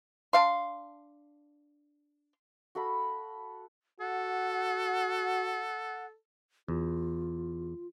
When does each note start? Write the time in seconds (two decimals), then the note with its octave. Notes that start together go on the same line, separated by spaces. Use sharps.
0.33 D4 F5 C6
2.75 F#4 A4 F5 B5
4.00 F#4 A4 F#5
6.68 E2 F4